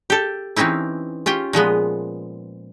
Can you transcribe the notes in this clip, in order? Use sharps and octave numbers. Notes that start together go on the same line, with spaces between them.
G4 A4
E3 C4 C#4 D#4 E4
C#4 F4 G4 G5
A#2 F3 G#3 B3